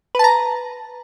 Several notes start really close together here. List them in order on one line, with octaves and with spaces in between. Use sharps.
B4 A5 A#5